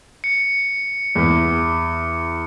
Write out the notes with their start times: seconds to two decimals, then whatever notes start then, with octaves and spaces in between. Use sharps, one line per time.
0.24 C#7
1.15 E2